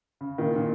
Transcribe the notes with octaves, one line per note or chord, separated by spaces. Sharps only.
C#3
A#2 D#3
A#2